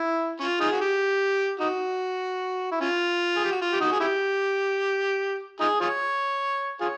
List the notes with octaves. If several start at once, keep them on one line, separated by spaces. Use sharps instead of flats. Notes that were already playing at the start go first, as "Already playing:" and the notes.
Already playing: E4
C#4 F4
D#4 F4 G#4
F#4
G4
D#4 F#4
E4
C#4 F4
G#4
G4
F#4
F4
G4
D#4 F#4
G#4
E4 G4
D#4 F4 G#4
F4 G#4 C#5
F4 G#4 C#5